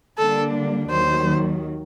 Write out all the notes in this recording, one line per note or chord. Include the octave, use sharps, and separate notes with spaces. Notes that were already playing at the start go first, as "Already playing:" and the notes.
D3 G3 A#3 D4 A4
D#2 D#3 F#3 C5